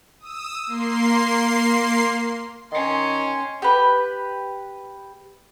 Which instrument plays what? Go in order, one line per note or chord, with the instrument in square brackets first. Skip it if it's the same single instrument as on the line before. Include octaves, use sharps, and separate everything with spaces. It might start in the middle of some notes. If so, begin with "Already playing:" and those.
[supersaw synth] D#6 E6
A#3 C6 C7
[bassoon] D#3 [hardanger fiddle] C#4 C6
[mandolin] G4 B4